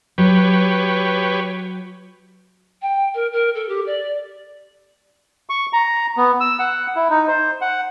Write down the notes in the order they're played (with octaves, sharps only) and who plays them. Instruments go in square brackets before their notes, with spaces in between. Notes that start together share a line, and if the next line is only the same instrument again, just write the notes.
[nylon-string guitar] F#3 [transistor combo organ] G4 B4 C#5
[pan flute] G5
A#4
A#4
A4
G4
D5
[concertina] C#6
A#5
B3
E6
F#5
E4
D#4
C5
F#5